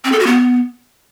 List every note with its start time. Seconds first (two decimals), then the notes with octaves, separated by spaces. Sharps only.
0.05 C4
0.12 A4
0.19 F#4
0.27 B3